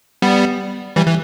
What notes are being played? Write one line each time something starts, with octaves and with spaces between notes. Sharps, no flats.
G3 B3
E3 G3
E3